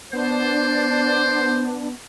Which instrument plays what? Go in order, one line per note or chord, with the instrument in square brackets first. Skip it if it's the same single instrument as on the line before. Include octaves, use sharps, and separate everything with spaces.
[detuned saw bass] B3 [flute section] D4 [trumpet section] C5